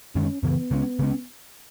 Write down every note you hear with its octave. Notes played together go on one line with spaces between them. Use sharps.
F#2 D#3 G#3 C#4
F#2 C#3 E3 B3
C#3 G#3 C#4
C#3 G#3 C#4